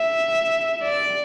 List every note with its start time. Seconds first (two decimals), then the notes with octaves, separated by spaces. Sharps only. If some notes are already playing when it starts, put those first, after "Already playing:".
Already playing: E5
0.83 D5